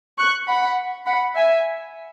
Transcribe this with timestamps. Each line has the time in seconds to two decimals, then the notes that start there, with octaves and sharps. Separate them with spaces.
0.18 C#6 F#6
0.48 F#5 B5
1.07 F#5 B5
1.35 E5 G#5